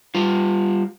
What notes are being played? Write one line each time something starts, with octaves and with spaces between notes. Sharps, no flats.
G3 F4